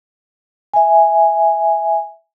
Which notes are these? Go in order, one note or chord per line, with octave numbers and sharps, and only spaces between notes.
E5 G#5